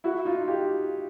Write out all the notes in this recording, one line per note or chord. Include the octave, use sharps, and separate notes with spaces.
E4 F#4
D#4 F4
F4 G4